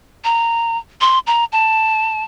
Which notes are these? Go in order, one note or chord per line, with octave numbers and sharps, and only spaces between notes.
A#5
C6
A#5
A5